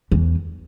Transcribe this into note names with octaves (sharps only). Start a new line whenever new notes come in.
E2